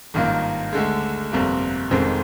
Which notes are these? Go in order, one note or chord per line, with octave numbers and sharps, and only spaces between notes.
G#1 G2 D#3 A#3 F4
D2 D3 G#3
G1 F2 C3 G3 A#3
F1 F2 D#3 G#3 C4